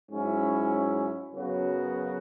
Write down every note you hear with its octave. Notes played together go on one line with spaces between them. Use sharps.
G#2 F#3 C#4 E4
F#2 C#3 F#3 B3 F#4